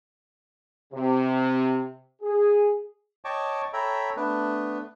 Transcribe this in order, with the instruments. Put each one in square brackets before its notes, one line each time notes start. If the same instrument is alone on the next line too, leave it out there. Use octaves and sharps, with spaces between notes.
[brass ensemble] C3
G#4
[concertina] C#5 D#5 G5 A5 C#6 D6
A4 C#5 E5 G5 A#5 B5
A3 B3 D4 B4